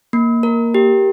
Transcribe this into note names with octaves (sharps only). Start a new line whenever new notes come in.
A#3
A#4
G4